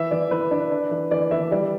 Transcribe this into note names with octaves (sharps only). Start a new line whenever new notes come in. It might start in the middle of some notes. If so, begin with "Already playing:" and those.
Already playing: E3 E5
E3 D5
E3 B4
D4
D4
E3
E3 D5
E3 E5
G3 D5